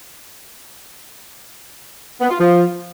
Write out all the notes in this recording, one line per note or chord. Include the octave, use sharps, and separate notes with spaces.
B3
F4
F3